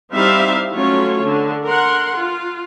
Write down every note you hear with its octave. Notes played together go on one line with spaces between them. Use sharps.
G3 C4 D#4 E4 E5 F5
F#3 A3 C#4 F4 C#5
D3
A#4 F#5 C6
F4